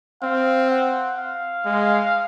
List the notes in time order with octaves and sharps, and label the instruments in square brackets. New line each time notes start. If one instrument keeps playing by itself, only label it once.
[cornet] C4 [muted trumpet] F5
[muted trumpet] F#5
F5
[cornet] G#3